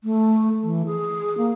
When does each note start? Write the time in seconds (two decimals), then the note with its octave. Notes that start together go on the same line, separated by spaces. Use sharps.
0.04 A3
0.63 E3
0.86 G#4
1.38 A#3